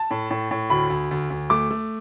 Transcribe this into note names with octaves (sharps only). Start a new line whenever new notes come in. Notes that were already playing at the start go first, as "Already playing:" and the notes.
Already playing: A5
A2
A2
A2
D2 B5
D2
D2
D2
A3 D6
A3